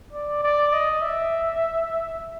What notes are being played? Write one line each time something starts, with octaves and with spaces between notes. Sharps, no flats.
D5
D5
D#5
E5